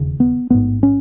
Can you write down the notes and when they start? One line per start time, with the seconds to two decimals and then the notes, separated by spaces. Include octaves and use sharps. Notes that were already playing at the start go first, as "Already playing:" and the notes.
Already playing: E1 D#2 C#3
0.20 B3
0.50 A1 G#2 B3
0.83 C#4